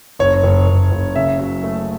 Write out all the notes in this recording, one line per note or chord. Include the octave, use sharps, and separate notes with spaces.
F#1 C#5
F#1
F#1
F#1
C#3 E5
F#3
A3